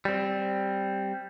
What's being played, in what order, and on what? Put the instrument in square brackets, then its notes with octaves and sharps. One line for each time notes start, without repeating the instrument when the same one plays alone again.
[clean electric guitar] G3 C4